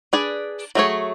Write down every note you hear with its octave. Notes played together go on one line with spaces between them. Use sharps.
D4 G#4 B4 D5
F#3 A3 D4 G#4 C#5